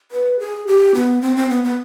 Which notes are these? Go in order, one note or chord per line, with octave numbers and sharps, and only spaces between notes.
B4
G#4
G4
B3
C4
C4
B3
B3